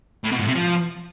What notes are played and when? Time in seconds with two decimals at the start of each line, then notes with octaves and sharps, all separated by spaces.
0.24 A2
0.32 B2
0.40 G#2
0.47 C3
0.55 F3